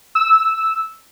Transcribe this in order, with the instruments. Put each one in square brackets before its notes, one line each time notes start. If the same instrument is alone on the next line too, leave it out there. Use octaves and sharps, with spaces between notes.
[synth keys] E6